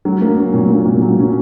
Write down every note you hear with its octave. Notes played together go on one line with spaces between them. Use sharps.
F#3
A#3
C#4
A#2
A#3
A#2
F#3
C#4